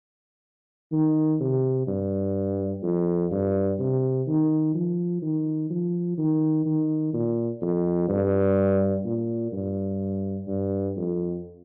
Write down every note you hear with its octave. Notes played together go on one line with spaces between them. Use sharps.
D#3
C3
G2
F2
G2
C3
D#3
F3
D#3
F3
D#3
D#3
A#2
F2
G2
A#2
G2
G2
F2